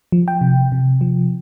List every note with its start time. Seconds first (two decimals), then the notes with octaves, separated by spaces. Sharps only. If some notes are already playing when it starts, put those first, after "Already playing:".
0.12 F3
0.28 G5
0.41 C3
0.72 C3
1.01 F3